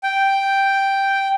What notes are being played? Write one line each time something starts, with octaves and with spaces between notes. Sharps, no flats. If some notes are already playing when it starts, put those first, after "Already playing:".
G5